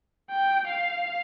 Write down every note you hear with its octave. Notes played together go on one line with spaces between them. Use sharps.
G5
F5